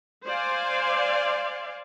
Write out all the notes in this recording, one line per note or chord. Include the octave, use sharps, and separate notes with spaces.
C5 D5 F5 G#5 C6